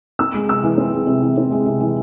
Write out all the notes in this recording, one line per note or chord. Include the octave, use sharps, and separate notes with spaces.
C4 E6
G#3
C3 E6
E3
C4
G#3
C3
E3
C4
G#3
C3
E3